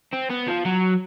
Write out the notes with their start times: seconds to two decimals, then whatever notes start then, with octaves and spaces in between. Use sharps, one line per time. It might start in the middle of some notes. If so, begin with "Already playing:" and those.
0.13 C4
0.30 B3
0.48 F3
0.65 F#3